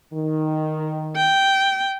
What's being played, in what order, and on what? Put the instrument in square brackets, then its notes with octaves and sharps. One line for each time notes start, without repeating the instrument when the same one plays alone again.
[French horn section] D#3
[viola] G5